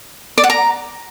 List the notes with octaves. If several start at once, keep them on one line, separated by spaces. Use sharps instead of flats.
D5
F#5
A#5